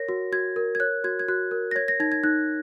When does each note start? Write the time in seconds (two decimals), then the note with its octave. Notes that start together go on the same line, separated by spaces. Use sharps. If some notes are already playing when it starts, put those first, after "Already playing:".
Already playing: A#4 C#5 A#6
0.09 F#4
0.32 F#4 G#6
0.56 A#4
0.75 G#6
0.80 C#5 F#6
1.04 F#4 G#6
1.19 G#6
1.28 F#4 F#6
1.51 A#4
1.71 A#6
1.76 C#5 G#6
1.88 A#6
2.00 D#4 G#6
2.12 G#6
2.23 D#4 F#6